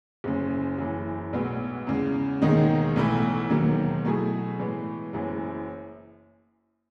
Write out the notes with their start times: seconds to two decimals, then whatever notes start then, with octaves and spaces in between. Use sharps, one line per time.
0.24 F#1 F#2 C#3
0.78 F#1 F#2 E3
1.33 B1 A2 G#3 B3 F#4
1.87 E2 C#3 G#3
2.42 E1 D#2 D#3 G#3 D#4
2.96 B1 A2 E3 A3 E4
3.50 E1 D#2 D#3 F#3
4.05 B2 F#3 A3 E4 G#4
4.59 A2 E3 G#3 B3
5.13 F#1 F#2 E3